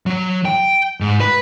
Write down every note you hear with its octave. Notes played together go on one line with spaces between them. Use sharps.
F#3
G5
G#2
B4